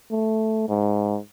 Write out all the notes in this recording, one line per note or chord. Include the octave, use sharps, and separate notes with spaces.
A3
G#2